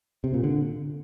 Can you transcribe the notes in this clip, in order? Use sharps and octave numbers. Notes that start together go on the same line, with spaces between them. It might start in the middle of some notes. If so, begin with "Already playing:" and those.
C3
A#2
D3